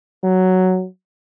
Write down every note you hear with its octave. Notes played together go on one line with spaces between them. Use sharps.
F#3